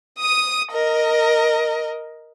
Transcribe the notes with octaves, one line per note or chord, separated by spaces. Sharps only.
D#6 D#7
A#4 D#5